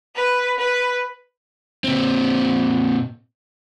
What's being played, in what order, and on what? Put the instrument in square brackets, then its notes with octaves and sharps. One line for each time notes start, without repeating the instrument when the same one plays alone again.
[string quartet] B4
B4
[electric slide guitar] A#2 C4